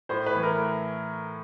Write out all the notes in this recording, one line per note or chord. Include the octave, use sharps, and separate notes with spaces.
A2 C5
B4
E3 A3
A#4